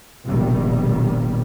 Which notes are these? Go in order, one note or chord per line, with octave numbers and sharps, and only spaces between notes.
F1 A#1 B2 D#3 G3